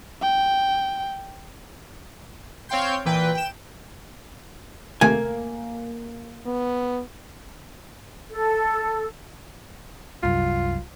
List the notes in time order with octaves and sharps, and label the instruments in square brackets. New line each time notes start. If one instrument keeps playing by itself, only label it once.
[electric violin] G5
[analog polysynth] C4 C#5 F5 G5 C6 G6
A#2 E3 B4 G5
G5 E7
[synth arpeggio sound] D#2 C3 A3 [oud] A#3 [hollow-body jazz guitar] G#5
[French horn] B3
[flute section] A4
[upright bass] C2 F#2 [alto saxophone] F4